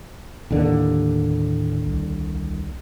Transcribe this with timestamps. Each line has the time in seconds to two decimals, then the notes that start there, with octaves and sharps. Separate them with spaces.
0.51 D#2 A2 D3 A#3
1.86 C2